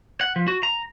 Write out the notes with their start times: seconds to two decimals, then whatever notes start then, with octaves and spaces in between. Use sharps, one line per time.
0.21 F#5
0.36 F3
0.48 F#4
0.63 A#5